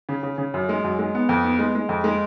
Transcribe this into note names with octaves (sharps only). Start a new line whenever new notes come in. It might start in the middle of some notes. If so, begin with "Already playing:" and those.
C#3
C#3
C#3
F#2
G#3
F#2
G#3
B3
F2
B3
G#3
G#3
F2
G#3